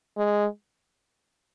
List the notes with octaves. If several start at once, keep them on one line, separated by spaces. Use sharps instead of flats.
G#3